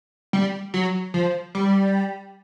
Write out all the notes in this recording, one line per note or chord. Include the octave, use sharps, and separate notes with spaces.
G3
F#3
F3
G3